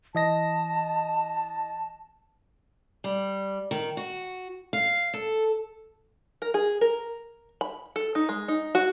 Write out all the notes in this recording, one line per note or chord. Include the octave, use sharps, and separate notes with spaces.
E3 D#5 A5 A#6
G3
D#3
F#4
F5
A4
A#4
G#4
A#4
B5
A4
D#4
G#3
D#4
F#4